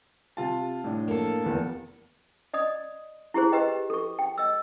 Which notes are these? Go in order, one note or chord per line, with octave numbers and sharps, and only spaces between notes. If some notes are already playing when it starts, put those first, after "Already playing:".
C3 F4 A5
A2 D4
A#3 A4
F1 E2 B3
D5 D#5 D#6
E4 G4 G#4 C5
G4 B4 D#5 G5
A4 C#6
G5
D#5 E6